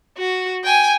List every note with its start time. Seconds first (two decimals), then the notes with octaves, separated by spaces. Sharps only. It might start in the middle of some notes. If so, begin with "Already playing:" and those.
0.17 F#4
0.64 G5 G#5